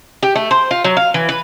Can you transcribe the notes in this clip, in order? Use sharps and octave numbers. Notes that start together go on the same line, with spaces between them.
G4
A3
C5
F4
F#3
F5
E3
B4